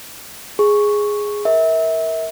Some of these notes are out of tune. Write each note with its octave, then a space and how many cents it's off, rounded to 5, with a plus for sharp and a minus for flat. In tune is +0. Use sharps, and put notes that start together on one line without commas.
G#4 +0 C#6 +0
A#4 +0 E5 -30